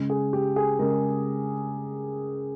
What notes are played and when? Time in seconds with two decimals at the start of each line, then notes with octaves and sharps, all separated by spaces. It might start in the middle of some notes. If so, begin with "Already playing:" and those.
Already playing: C#3 G#3
0.10 G#4
0.33 G4
0.56 G#4
0.79 C#3 G#3 A#4